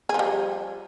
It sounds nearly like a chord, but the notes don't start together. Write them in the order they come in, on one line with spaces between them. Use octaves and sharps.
G#4 F3 G3